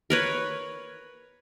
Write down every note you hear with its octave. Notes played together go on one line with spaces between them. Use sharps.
A#4 B4 C#5